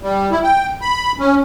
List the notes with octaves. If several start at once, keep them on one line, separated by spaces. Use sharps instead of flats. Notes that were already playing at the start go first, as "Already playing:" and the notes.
G3
E4
G5
B5
C#4